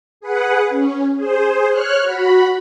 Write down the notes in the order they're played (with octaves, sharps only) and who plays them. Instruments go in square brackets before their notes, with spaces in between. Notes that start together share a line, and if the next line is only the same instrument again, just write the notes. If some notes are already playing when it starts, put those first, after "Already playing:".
[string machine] G#4 B4 F#5
C#4
G#4 C5
C#5 F6 F#6
F#4 B5